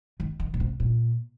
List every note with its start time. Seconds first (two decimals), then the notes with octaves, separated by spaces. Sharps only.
0.20 D#3
0.40 D#3
0.54 A#2
0.60 C3
0.80 A#2